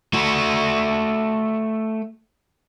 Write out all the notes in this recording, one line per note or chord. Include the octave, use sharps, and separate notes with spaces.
A3 F#4